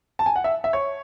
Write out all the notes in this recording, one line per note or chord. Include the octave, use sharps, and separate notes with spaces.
A5
G#5
F#5
E5
E5
C#5